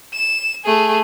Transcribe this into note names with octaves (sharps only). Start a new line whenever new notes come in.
E7
A3 G#4